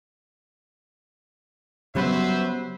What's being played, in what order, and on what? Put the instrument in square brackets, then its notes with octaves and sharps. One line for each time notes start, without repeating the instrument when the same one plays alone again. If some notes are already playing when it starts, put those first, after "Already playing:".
[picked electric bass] C#3 G3 B3 [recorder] F#3 [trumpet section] B4 C5 E5